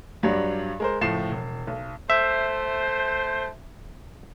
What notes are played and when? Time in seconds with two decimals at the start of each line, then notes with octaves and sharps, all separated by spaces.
0.23 G2 F#3 G3 D4
0.80 G#3 A#4 C5
1.01 F#1 A2 F3 C7 E7
1.31 E1
1.67 B1
2.10 A3 C5 E5